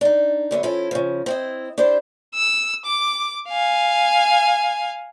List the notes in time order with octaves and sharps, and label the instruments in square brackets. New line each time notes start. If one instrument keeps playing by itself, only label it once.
[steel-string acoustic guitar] D4 D#4
F#2 D3 B3
F3 C#4 E4 A4
C#3 F3
C4 E4 D#5
D4 E4 G4 C5
[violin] E6
D6
F5 G#5